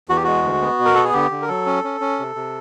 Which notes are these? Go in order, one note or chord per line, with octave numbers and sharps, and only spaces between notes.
E2 F#4
G4
G#3 F#4
D2
B3
B2
A#4
B3 A4
G#4
D3 G4
D3
A#4
F#3 A4
C#4
C#4
C#4
C3
C3